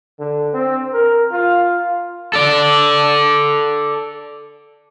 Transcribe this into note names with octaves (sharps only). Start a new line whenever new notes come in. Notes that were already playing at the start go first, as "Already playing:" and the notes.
D3
C4
A#4
F4
A4 D5